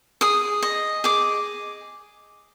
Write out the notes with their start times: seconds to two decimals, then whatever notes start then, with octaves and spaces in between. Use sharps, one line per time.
0.21 G#4 D#6
0.63 D#5
1.04 G#4 D6